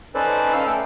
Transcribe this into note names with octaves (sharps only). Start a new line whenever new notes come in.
C#4 D#4 A4 B4 C5 D5
D#4 A4 F5 E6
A3 G5